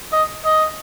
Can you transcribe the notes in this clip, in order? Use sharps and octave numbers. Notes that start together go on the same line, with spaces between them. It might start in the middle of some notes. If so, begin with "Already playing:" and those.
D#5
D#5